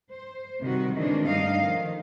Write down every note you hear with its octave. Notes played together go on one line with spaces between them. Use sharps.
C5
C3 D#3 G3 F#4
D#3 E3 G#3 C4 D4
G2 A3 D4 D#4 D#5 F5
D#3 F3 A3